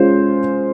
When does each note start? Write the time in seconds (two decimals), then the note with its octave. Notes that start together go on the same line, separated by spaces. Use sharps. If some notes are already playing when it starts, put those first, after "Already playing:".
Already playing: G#3 C#4 F4 C5